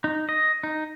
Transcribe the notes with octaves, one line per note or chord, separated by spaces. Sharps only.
D#4
D#5
D#4